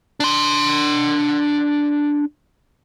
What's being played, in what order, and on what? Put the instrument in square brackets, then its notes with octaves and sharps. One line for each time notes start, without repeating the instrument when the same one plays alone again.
[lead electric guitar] D4 C6